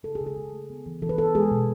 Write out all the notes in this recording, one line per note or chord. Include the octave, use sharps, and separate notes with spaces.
C#3 A4
G#4
C#3
G#4
C#3
A3
B3
E3
E3 A4
B4
B3 A4
G#3 G#4
B2